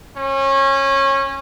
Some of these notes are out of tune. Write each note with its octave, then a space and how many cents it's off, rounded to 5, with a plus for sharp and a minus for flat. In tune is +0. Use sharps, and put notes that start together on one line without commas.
C#4 -25